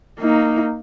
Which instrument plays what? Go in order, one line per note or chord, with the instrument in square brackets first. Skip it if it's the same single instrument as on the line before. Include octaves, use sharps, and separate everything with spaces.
[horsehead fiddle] A#3 D#4